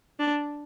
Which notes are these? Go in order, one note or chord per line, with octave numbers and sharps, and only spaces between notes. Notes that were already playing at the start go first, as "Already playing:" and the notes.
D4